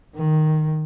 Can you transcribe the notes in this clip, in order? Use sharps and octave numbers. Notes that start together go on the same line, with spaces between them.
D#3